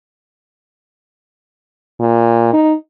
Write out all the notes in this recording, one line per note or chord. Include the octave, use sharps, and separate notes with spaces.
A#2
D#4